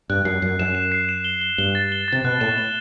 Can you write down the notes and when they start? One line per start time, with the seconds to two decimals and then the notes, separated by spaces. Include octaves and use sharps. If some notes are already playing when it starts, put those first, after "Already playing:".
0.09 G2 F#6
0.25 F#2 C7
0.42 F#2 C7
0.59 F#2 E7
0.75 E7
0.92 C7
1.09 E7
1.24 G7
1.41 G7
1.58 G2 G7
1.75 A6
1.92 G7
2.08 C3 A6
2.24 B2 F#6
2.40 A2 E7
2.58 G7